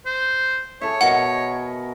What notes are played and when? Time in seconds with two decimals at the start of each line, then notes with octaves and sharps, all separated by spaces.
0.06 C5
0.81 G#4 A4 C#5 E5
1.01 B2 A#4 F#5 B5